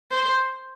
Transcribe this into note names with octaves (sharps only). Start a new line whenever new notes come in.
C5